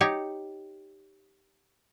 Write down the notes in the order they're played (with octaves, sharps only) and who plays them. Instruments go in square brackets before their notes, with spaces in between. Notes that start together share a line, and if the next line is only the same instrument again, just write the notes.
[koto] D#4 G4 C#5